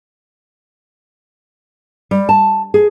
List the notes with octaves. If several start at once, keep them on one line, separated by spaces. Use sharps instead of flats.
G3
A5
G#4